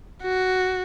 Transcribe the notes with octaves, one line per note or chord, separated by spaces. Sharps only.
F#4